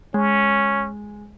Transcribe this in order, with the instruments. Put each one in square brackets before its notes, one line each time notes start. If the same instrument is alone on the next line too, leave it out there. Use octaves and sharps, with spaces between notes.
[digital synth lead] G#3 [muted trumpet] C#4